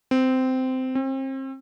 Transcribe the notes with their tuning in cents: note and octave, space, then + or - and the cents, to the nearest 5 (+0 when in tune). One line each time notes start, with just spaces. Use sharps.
C4 -15
C4 +35